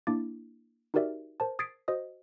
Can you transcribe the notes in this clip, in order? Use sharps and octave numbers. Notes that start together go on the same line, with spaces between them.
A#3 D4 E4 D6 A6
D#4 F#4 G4 A#4 D5 E5
A#4 C5 A5
D#6 G#6 A6 B6 C7 D7
F#4 C5 D#5 D#6